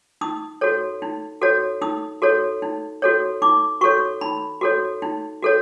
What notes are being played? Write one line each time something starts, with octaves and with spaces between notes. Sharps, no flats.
D#4 D#6
F#4 A4 C#5
D#4
F#4 A4 C#5
D#4 D#6
F#4 A4 C#5
D#4
F#4 A4 C#5
D#4 D6
F#4 A4 C#5 C#6
D#4 B5
F#4 A4 C#5
D#4
F#4 A4 C#5